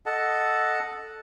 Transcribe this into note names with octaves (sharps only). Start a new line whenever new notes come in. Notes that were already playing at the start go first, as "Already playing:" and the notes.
A4 D#5 F#5 A5